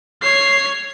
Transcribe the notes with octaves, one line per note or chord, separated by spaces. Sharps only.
C#5 C7